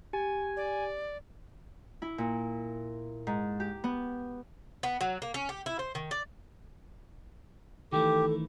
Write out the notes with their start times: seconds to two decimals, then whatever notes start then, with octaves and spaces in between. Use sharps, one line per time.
0.13 G4 G#5
0.57 D5
2.02 E4
2.18 A#2
3.27 G#2
3.60 G4
3.84 B3
4.83 B3
5.01 F#3
5.22 A#3
5.34 C#4
5.49 G4
5.66 E4
5.79 C5
5.95 D#3
6.11 D5
7.92 D#3 E3 A3 G4 A4